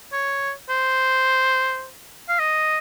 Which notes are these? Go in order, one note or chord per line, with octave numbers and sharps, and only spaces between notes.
C#5
C5
F5
D#5